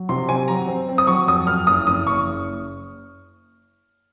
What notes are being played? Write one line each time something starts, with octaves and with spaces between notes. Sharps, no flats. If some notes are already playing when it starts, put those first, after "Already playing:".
Already playing: F#3
C3 C6
C4 G#5
F#3 A#5
C4
C4
D#6
F#3 C#6
F2 D#6
F2 F6
F#1 D#6
F#1 D#6
F#1 C#6